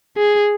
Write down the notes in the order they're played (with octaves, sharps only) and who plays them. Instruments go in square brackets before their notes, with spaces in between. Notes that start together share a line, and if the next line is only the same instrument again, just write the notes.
[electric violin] G#4